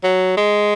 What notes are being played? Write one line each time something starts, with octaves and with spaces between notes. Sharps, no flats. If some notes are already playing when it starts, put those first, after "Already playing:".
F#3
G#3